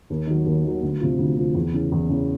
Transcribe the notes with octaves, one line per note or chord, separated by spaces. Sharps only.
D#2
D#3 F#3
D#2
D#3 F#3
D2
C3 F3
D2
C3 F3
E2
C#3 E3
E2
C#3 E3